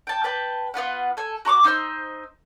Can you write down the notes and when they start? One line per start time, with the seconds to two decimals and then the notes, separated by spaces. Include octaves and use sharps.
0.07 G5 A5
0.24 B4 G5 A5
0.74 B3 F4 B4 F#5
1.17 A4 G#5
1.45 F#4 A#5 C#6 D6
1.64 D#4 C5 D#5 E6